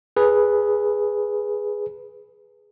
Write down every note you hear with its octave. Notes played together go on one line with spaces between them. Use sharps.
G#4 B4